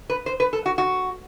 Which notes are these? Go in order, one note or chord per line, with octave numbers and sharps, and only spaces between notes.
B4
C5
B4
A4
F#4
F#4